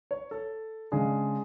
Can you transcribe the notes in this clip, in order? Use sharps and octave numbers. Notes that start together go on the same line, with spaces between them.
C#5
A4
C#3 G#3 D4 G#4